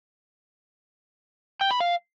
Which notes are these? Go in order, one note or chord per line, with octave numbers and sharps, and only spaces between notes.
G5
B5
F5